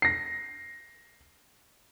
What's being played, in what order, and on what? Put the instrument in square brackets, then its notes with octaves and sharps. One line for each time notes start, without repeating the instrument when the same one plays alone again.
[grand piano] A#6 C7